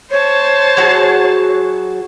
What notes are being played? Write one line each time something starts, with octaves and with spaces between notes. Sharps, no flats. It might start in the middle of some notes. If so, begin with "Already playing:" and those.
C5 C#5 A5
F#3 F#4 G#4